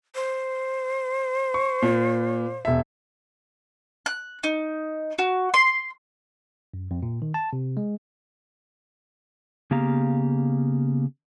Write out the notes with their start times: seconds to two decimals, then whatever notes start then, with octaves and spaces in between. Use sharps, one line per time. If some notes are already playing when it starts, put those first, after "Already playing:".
0.15 C5
1.54 C#6
1.82 A#2
2.65 E1 E5
4.06 F#6
4.44 D#4
5.19 F#4
5.54 C6
6.74 F#2
6.91 F2
7.03 A#2
7.22 D#3
7.34 A5
7.53 C3
7.77 G#3
9.71 C#3 A#3 B3 G4 F5 A#5